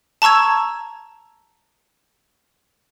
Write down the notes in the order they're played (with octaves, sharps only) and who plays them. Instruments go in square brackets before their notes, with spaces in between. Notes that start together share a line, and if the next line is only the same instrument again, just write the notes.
[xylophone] A5 A#5 C#6 E6 G#6